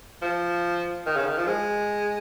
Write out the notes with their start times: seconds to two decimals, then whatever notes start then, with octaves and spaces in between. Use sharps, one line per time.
0.22 F3
1.06 D#3
1.16 C#3
1.26 D#3
1.37 F3
1.47 G#3